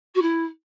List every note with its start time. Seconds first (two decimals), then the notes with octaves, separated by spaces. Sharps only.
0.15 F#4
0.21 E4